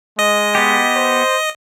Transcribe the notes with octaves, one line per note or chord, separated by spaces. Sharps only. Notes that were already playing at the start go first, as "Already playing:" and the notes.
G#3 D#5
B3 G4
C5